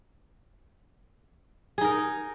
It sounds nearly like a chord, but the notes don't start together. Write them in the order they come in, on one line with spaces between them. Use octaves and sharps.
G#4 D#4 A#4